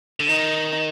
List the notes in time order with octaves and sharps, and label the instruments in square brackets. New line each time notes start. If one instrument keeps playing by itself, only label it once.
[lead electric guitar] D3
[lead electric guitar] D#3 [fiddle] D#4